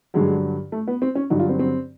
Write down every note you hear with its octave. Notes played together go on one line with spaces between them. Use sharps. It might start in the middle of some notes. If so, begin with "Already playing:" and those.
G2 D3 F#3 G#3
A3
B3
C4
C#4
G2 D3 F#3 D#4
F4
C4
C4